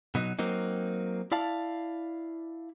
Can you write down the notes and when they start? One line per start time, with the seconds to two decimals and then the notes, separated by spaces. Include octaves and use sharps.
0.15 B2 F#3 D#4
0.39 F#3 A#3 C4 D#4
1.32 E4 D5 F5 A5